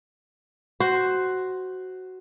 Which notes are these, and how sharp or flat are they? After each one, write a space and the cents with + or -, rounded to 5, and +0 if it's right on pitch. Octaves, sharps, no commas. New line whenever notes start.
F#4 +10 C5 +0